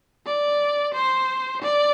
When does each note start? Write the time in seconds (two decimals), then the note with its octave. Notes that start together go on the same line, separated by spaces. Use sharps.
0.26 D5
0.94 C5
1.62 D5